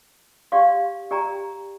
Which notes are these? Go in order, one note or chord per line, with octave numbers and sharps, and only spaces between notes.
G4 D5 F5 C6
G4 D5 G5 A#5